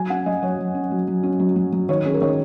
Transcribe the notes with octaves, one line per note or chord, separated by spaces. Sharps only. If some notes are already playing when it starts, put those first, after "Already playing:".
Already playing: F#3 G#5
C#4 F#5
F#3 D#5
F#3 C#5
F#3
C#4
F#3
F#3
C#4
F#3
F#3
F#3
D#3 C#5
C#4 G#4
A#4
D#3 C#5